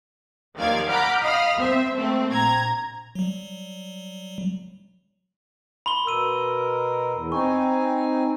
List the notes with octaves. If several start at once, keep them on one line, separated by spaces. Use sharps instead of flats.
D#2 D#3 F3 D5 F5 G#6
F#5 A#5 B5 D6 F6 G6
D#5 F5 B5 D#6 F6
C4 C5 E5
A3 A#3 C4
A#1 A#5 G#6
F#3 G3
B5 C6 G7
B2 A#4 C6 E6 D#7
E2
C4 D#4 G#5 C#6